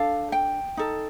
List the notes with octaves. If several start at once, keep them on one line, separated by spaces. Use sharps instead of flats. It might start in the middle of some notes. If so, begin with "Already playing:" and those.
Already playing: D4 A4 F5
G5
D#4 A4